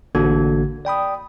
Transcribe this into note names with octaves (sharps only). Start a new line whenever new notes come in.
A1 D3 A#3 D4 F#4 G#6
D5 G5 B5 D#6